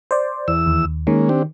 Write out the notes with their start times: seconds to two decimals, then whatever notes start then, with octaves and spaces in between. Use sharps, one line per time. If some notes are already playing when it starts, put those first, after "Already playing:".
0.11 C5 D5
0.48 E2 E6
0.67 D#2
1.07 D#3 G#3 A#3 C#4
1.29 C4 D4 G4